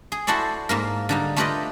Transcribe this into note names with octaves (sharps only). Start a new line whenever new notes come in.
G#4
E4 F#4 A4 C5 D5
G#2 A#3 A#4
D3 G3 D#4
A3 F4 G4 B4 D5 D#5